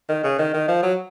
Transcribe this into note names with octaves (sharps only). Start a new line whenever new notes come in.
D#3
C#3
D#3
D#3
F3
F#3